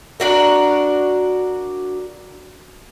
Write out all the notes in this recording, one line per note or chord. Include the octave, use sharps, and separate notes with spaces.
D4 F#4 A#4